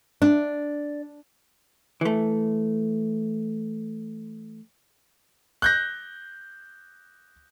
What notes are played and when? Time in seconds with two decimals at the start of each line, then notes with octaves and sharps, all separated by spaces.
0.22 D4
2.01 E3 A3
5.62 F#6 G6 A#6